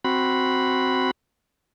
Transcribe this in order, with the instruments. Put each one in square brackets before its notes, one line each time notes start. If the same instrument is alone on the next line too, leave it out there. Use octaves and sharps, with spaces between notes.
[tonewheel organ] C4 F#4 B5